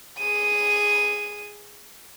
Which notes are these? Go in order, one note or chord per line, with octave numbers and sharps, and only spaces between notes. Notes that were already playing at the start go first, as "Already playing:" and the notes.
G#4 D#7